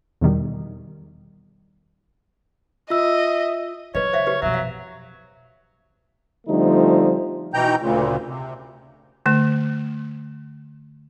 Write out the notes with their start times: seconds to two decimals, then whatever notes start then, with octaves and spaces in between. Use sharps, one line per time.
0.21 E2 B2 D#3 G3
2.90 F4 D#5 E5 E6
3.95 C#3 F#3 B4 C#5 D#5
4.13 C5 E5 F5
4.27 G4 B4
4.42 F2 B2 F#3 E5
4.54 F5
6.47 D3 F3 G3 A3 C4 D#4
7.54 B2 E3 D#4 G5 A#5 G6
7.81 D2 A#2 C#3
8.27 C3
9.26 D3 A3